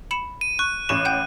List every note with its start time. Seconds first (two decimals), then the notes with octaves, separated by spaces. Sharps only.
0.11 B5 C#7 E7
0.41 D#7
0.59 C#6 F#6
0.89 A1 C#6 E7
1.05 F#5 G5 G6